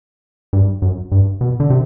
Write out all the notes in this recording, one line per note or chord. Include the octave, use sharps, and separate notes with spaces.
G2
F#2
G2
B2
D3
C3